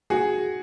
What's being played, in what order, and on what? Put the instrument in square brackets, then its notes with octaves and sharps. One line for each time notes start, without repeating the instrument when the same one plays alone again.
[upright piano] F#4 G#4